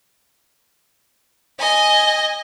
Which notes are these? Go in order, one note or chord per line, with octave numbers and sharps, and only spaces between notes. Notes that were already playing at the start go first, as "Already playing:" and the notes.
D#5 G#5